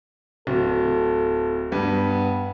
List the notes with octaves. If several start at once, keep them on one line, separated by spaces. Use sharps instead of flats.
D1 A4
G2 B3